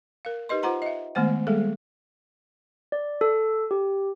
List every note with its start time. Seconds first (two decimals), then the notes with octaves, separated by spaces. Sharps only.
0.25 A#4 F5
0.49 D#4 G4 B4 D#5 C6
0.63 F4 C5 F#5 A#5 C6
0.82 D#5 E5
1.15 D#3 G#3 A3 B3 C5 F#5
1.47 G3 G#3 A#3 G#4 A4
2.92 D5
3.21 A4
3.71 G4